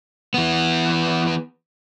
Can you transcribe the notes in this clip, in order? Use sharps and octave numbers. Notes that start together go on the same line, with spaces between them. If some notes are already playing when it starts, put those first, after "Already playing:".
E3 B3